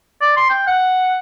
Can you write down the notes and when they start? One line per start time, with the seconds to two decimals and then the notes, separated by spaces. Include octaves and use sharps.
0.21 D5
0.37 C6
0.50 G5
0.67 F#5